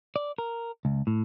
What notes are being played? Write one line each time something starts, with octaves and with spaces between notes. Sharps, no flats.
D5
A#4
C#2
A2